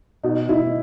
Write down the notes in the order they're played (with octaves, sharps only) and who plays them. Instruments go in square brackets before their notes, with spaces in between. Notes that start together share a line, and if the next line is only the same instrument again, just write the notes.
[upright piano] B2 D#4
B2 E4